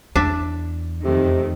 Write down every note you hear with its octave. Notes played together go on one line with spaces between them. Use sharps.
E2 D4 E5
F2 C3 D#3 A3